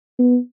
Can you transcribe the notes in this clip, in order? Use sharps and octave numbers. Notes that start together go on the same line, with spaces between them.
B3